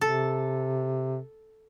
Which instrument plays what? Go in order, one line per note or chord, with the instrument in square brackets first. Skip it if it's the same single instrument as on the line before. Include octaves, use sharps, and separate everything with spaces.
[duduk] C3 [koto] A4